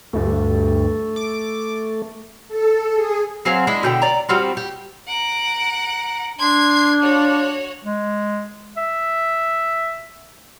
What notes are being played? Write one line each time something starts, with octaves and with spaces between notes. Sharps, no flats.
D2 G2 A3
D6
A4
G#4
F#3 C4 G#4 F5
G#3 D4 E4
B2 D3 G5
D5 A#5
G3 C4 F4 F#4
G4
F#5 A#5 D7
D4 C6 G#6 C7
F4 F#4 C#5
G#3
E5